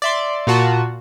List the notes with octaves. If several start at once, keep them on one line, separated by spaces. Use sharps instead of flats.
D5 E5 C6
A#2 F4 F#4 A5